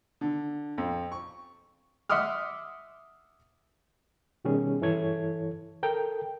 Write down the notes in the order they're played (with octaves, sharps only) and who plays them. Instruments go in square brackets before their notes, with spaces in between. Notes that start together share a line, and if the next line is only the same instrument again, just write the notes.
[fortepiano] D3
F2
C#6
E5 F#5 C6 D6 D#6 F6
[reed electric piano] B2 D#3 G3 C#4 G#4
G2 E3 E4 A4 C#5 G#6
A4 A#4 G5